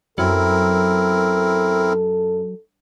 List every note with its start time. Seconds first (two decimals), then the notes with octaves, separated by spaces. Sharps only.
0.18 F#2 F#3 C4 E4 A4 A#4